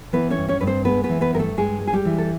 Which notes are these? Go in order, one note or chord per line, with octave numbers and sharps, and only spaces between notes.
E3 B3 B4
C#4 C#5
G2
C#4 C#5
G2 B4
C4 C5
G#3 B3 B4
B3 B4
E3
B3 B4
G2 A#4
A3 A4
G2 G#3 G#4
G#3
G#4
G3 G4
E3
A4